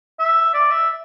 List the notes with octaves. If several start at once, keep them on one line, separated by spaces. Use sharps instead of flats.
E5
D5
E5